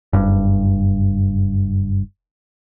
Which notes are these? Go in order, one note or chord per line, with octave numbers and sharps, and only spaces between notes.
F#1 G2